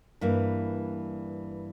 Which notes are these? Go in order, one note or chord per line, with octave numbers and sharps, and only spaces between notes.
G2 E3 A#3